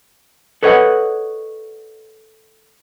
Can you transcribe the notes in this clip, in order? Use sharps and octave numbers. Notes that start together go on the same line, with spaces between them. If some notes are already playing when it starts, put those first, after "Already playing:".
A4 B4 C#5 D#5 F#5